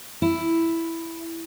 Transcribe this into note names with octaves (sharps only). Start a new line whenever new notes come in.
E4